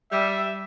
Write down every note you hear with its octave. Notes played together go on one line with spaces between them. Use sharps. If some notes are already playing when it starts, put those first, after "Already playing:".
G3 E5